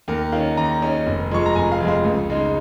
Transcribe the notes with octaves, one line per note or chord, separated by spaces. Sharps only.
D#2 A#4
D#3 C#4 F5
D#2 A#5
D#3 C#4
F1
F2 F3 G#3 C#6
A#5
F1 G#5
F5
F2 F3 G#3
F5
C#2
C#3 G#3 D#4